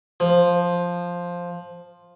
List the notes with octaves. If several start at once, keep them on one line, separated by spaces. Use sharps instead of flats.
F3